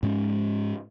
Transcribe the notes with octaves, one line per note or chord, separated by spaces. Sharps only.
G#2 G#3 C#4